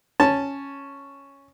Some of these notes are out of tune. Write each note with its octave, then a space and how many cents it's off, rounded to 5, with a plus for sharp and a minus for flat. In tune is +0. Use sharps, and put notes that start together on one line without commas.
C#4 +0 A5 +0